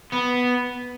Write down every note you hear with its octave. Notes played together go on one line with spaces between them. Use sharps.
B3